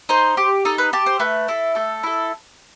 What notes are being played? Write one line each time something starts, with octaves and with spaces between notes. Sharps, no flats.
D#4 C5
G4
D#4 A4
B4
G4 A5
C5
A3 B4
E4 A4
A3 A4
E4 A4